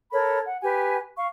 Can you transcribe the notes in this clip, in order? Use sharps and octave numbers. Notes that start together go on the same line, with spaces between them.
A4 A#4 C#5 B5
F#5
G4 B4 G#5
F5 C#6